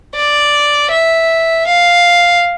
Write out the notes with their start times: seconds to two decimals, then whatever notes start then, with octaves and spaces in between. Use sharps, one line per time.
0.15 D5
0.91 E5
1.67 F5